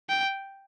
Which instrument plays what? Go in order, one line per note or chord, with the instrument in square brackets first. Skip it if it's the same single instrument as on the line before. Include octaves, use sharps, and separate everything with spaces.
[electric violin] G5